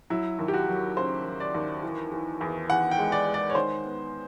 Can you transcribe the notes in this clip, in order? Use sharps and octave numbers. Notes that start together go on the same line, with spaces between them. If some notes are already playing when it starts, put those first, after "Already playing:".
F#3 E4
D#2
G4
F#4
F#3
C#3 C5
F#3
D5
D#2
E3
E3
E2
E2 F#5
G5
G#3
D5
G#3
D5
C#5
D#3 C5
B3